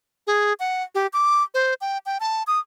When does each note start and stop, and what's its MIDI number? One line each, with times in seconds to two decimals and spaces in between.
0.27 0.53 68
0.60 0.83 78
0.95 1.07 67
1.13 1.43 86
1.54 1.74 72
1.81 1.98 79
2.06 2.18 79
2.20 2.43 81
2.47 2.59 87